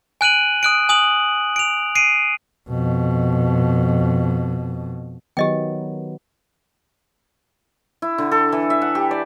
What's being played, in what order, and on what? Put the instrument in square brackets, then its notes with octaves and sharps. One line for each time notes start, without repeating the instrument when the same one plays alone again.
[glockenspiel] G#5 F#6 D#7 F#7
D#6 F#6 D7
G#5 D#6 F#7
D7 F7
C7 D7 D#7
[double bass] F2 B2
[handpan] D#3 F#3 B3 [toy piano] G4 D#5 G5
[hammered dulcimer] E4
D3
A4
E3
E5
F#5
G4
D5